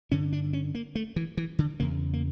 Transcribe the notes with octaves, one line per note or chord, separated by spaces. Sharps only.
G2 D3 C#4
D4
C#4
A#3
A3
E3
E3
D3
E2 C#3 A#3
A#3